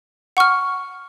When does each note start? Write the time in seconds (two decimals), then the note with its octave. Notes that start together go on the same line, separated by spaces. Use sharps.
0.37 F#5 C#6 F6